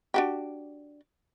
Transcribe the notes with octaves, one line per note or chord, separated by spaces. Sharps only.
D4 F#4 G4